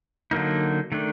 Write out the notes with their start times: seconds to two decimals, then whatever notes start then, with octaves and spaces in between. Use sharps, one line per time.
0.31 D3 F#3 A#3 D#4
0.92 D#3 A3 D4